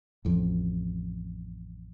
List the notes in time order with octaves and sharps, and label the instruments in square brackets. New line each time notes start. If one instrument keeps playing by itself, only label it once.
[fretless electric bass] A1 F2